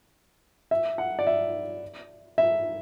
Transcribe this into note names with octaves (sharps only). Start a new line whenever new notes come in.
E5
F#5
D5
E5
E5